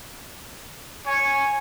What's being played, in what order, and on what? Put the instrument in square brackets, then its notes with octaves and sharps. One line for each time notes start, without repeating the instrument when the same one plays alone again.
[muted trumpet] C#5 [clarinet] G#5